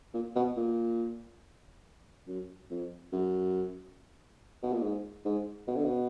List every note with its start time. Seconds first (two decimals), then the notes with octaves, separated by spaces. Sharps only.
0.14 A#2
0.36 B2
0.57 A#2
2.27 F#2
2.70 F2
3.12 F#2
4.63 B2
4.73 A#2
4.82 G#2
5.25 G#2
5.68 B2
5.76 D3
5.85 B2